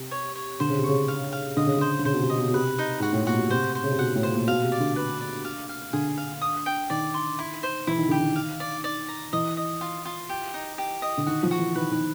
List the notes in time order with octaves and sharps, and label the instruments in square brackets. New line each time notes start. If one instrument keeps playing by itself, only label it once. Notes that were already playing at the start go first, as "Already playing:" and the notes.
Already playing: [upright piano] C3
[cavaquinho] C#5
C#5
[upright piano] D3 [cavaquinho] C5
[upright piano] C#3
C3
[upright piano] C#3 [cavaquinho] C#6
[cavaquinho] F5
F5
[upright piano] D3 [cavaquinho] D#5
[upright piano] C#3
[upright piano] D3 [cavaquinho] C5
[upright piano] D3
[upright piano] C#3 [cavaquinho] C5
[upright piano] B2
C3
[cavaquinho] D#5
[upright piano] B2
B2
[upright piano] C3 [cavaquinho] B4
[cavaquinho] D#4
[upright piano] G#2 [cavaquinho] F#4
[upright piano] A2
[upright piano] A#2 [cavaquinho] F#4
[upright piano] B2
[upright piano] C3 [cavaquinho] C5
[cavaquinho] C5
[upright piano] C#3
C3
[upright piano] B2 [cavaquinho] F#5
[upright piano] A2
[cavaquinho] C5
[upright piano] A#2
[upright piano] B2 [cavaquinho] F5
[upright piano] C3
[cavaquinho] D5
[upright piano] D3
[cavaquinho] B4
D5
F5
F5
[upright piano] D3 [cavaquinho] G#4
[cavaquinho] F5
D#6
G5
[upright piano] D#3 [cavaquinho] D5
[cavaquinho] C6
E4
C5
[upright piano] E3 [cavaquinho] E4
[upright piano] D#3
[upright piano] D3 [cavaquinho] G4
[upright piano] D#3
[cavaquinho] F5
D5
D5
A#5
[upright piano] E3 [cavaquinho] D#5
[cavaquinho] D#5
F4
F4
G4
D#4
G4
D#5
[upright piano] D3
[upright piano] D#3 [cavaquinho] F#4
[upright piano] F3
[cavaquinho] F#4
[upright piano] E3
[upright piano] D#3 [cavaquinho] B4
[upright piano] D#3